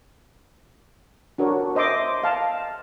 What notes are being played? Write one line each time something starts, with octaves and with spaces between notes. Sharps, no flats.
D4 F#4 A#4 C#5
C5 D#5 E5 C6 D6
D#5 F5 A5